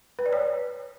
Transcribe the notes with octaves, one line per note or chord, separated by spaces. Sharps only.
B4
D5
C#5